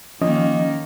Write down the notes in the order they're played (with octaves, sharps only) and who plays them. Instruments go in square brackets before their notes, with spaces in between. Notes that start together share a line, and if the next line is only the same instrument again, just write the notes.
[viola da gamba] D#3 A#3 [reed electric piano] F3 C#4 D#5